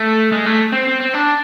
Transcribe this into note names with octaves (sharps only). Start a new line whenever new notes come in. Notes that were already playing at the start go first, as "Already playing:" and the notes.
Already playing: A3
G#3
A3
C4
C4
C4
D4